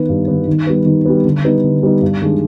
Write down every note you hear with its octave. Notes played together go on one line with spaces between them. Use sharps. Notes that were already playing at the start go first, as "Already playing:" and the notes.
Already playing: D#3 B3
G2
D#3 B3
D#3
G3 B3
D#3
G3 B3
D3
G3 B3 D#4
D3
G3 B3 D#4
G2
D#3 G#3 D4